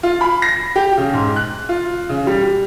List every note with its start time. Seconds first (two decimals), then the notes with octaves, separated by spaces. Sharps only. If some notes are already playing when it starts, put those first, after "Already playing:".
0.03 F4
0.21 B5
0.42 A#6
0.76 G4
0.97 C#3
1.13 G#2
1.36 F#6
1.69 F4
2.09 C#3
2.27 G3